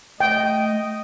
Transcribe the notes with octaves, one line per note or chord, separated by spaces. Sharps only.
A3 D#5 G5